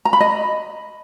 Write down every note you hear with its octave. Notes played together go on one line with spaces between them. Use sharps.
A#5
B5
D#5